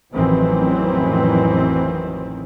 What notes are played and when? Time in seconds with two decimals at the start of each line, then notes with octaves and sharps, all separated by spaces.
0.13 A1 F2 D#3 E3 F#3 C4